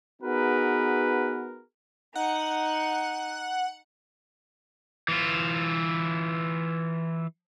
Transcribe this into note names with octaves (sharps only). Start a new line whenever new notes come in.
B3 D#4 F#4 G#4 A#4 B4
D#4 F#5
E3 F4